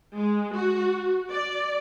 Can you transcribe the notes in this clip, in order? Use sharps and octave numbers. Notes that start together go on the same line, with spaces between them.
G#3
F#4
D5